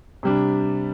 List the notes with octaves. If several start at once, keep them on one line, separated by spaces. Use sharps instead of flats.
C3 G3 D4